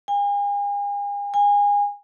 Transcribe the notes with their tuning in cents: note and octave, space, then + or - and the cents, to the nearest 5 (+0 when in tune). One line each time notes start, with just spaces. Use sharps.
G#5 -40
G#5 -30